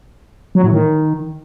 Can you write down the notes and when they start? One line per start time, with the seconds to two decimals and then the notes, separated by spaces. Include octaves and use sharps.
0.55 F#3
0.64 A2
0.72 D#3